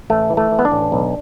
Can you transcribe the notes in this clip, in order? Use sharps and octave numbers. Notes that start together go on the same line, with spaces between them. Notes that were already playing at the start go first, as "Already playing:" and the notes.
A1 A3
E3
A3
E3
B3
D4
A1
B1